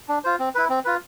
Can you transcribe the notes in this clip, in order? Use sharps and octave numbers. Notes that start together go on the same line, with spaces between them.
D4
F4 C5
C4
E4 B4
C4
F4 B4